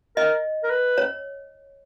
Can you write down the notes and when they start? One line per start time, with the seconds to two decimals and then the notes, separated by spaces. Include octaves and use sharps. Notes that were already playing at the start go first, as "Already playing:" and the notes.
0.17 A#4 D#5
0.64 A#4
0.70 B4
0.98 C#5